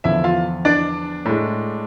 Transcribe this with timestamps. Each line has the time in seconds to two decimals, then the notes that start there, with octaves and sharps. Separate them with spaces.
0.04 E2 D3 F3 E4 E5
0.24 F4 F5
0.65 D4 D5
1.25 A2 G#3